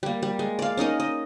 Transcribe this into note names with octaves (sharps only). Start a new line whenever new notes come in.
G3 A#3
G3
G#3
D5 F5
C#4 D#4 A#4 D#5
D#5